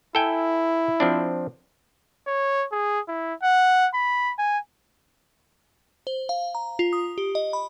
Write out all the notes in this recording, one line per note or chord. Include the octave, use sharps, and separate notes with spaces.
E4 A4 G5 G#5
F3 C4 D4
C#5
G#4
E4
F#5
B5
G#5
C5
F5
A#5
F4
D#6
G4
D#5
B5